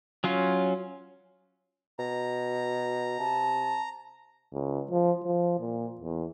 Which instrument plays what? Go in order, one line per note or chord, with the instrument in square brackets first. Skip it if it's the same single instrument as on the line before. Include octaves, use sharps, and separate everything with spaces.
[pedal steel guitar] F#3 C#4 F4
[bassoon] B2 [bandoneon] A#5
[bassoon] C3 [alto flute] A5
[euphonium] C#2
F3
F3
A#2
E2